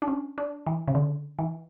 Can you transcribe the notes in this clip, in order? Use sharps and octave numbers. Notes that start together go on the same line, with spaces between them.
D4
C#4
D4
E3
C#3
D3
E3